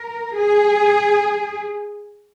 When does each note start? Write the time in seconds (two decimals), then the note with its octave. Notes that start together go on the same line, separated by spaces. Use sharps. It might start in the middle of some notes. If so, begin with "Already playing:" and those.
Already playing: A#4
0.36 G#4